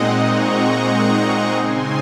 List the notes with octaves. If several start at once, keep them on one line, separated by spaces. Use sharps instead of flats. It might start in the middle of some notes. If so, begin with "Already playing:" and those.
Already playing: A#2 G#3 C4 D#4 D#5 F#5
A#5 C#6
C#3 G#3 C4 D#4 G#5 C6